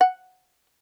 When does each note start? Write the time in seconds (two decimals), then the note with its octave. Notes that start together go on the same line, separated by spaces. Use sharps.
0.01 F#5